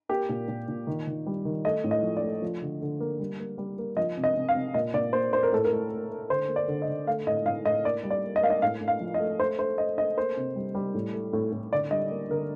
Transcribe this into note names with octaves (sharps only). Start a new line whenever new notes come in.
A#3 G4
A#2
A#2
A#2
D#3
D#3
G3
D#3
A3 D#5
A2
D#5
F3
D5
A3
F3
D3
D3
A#3
G3
A#3
G3
A#3
F3 D#5
C3
D#5
C3
F5
C3
A#2 D#5
A#2 D5
A#3 C5
A#3 C5
A#4
A2 A4
A#4
A3
A3
A3
D3 C5
A#3
D5
D3
D#5
D3
A3 F5
A2 D#5
A2 F5
A2 D#5
A#3 D5
G3
D5
A#3
D#5
A#3 F5
D#5
A2 F5
A2
F5
F3
D#5
A3
A3 C5
A3 C5
A3 D#5
A3 D#5
A#3 C5
C3
G3
G3
A2
A3
A2
A2
D3 D5
G3 D#5
A#3
D3 A#4